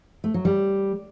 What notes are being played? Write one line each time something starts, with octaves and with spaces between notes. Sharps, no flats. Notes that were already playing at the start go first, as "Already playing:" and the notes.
A3
F#3
G3